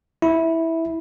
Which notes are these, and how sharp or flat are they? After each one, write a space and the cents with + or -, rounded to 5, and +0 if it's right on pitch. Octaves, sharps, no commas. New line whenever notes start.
E4 -10